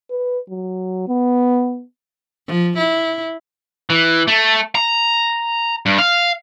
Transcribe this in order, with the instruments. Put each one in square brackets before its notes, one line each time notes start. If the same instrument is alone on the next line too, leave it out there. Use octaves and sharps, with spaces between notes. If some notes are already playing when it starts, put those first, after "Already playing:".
[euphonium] B4
F#3
B3
[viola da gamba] F3
E4
[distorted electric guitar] E3
A3
A#5
G2
F5